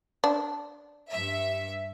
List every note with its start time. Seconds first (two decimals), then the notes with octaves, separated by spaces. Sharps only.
0.24 D4
1.09 G2 E5